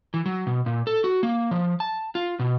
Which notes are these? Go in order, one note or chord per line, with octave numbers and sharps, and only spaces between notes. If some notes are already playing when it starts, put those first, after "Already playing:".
E3
F#3
B2
A#2
A4
F#4
A#3
F3
A5
F4
B2